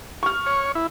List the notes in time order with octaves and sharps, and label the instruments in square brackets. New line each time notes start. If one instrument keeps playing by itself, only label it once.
[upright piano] C#6 F6
[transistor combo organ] C#5
E4